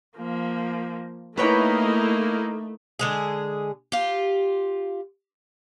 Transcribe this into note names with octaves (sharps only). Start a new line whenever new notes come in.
F3 A#3
A3 A#3 D#4 E4 B4 C#5 G5
D3 G#3 G#4
F4 G4